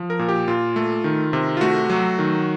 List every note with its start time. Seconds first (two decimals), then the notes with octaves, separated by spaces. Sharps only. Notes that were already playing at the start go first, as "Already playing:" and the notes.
Already playing: F3
0.10 A#4
0.19 A#2
0.28 G4
0.48 A#2 F4
0.76 A3
1.04 D#3
1.33 C3
1.57 F4
1.61 A3 F#4
1.90 F#3
2.19 D#3